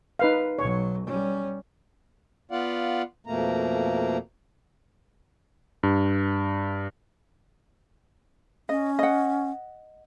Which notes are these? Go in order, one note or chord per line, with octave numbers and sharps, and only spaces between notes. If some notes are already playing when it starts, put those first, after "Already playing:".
D#4 B4 F5
B1 F#3 C#5
G3 C#4
B3 F4 D5 F5 F#5
F2 B2 A3 A#3 A#5
G2
C#4 D#5
D#5 F#5